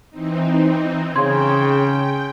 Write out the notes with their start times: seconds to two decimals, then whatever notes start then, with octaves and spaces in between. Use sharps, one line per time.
0.10 E3 C4 D#4
1.16 C#3 G5 C6 G#6